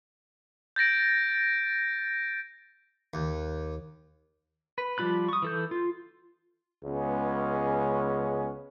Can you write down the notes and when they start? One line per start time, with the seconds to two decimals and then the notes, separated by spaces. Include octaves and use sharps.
0.76 G6 A6 A#6 D7
3.14 D#2
4.78 B4
4.98 F3 G3 F4 B5 F#6
5.29 C#6 D#6
5.42 E3 A4 G6
5.71 F4
6.84 C#2 C#3 G#3 B3 C#4